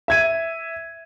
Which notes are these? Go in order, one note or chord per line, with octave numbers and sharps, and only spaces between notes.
E5 G#6 D#7